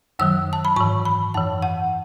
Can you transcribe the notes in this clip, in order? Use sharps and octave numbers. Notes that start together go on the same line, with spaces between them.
F#2 D#3 F#3 E6
A5
B5
G#2 E3 C#6
B5
F#2 E3 A5
F#5